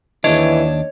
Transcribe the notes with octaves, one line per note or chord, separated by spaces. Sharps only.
D#2 E3 D4 C#5 D#5